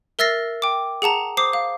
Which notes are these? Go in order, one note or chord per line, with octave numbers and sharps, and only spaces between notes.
A#4 E5 E6 A6 A#6 C7
G5 D6
G#4 F#5 A5 A#5
C5 D6 D#6 C7
F5